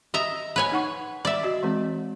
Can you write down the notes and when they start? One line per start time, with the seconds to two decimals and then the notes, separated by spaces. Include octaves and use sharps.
0.14 D#5 E5 A#5
0.56 B4 C#5 G#5
0.72 D#4 F#5 C#6
1.25 D5 E5
1.43 F#4 D#5
1.63 E3 G#3 C4